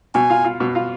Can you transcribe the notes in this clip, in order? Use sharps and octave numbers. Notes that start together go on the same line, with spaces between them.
B2 G#5
F4
F4
B2
F4